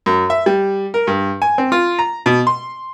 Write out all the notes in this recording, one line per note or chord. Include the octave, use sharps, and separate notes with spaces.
F#2
E5
G3
A#4
G2
G#5
C4
F4
A#5
B2
C6